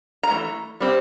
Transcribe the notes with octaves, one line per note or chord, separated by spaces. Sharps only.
A#5
E3 A3
G3 C4